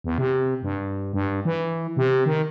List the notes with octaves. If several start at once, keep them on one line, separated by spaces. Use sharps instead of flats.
E2
C3
G2
G2
E3
C3
D#3